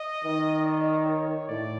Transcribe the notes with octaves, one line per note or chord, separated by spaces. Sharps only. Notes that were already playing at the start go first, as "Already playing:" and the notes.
Already playing: D#5
D#3
D5
C#5
A2 D5